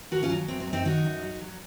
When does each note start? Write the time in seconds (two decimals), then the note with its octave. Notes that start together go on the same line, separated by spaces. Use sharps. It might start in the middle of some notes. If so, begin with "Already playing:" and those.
0.11 D#2 F#4 A#4
0.23 C#4 F4
0.30 F#3
0.48 F#2 C4
0.60 C4
0.67 F#2
0.73 C4 D#4
0.85 D#3 D#4 F#4
1.04 F#2
1.23 F#3
1.41 F#3